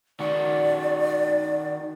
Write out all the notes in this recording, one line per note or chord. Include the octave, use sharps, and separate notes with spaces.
D#3 F#4 D5